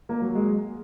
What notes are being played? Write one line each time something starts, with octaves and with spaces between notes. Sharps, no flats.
A#3
F#3
G#3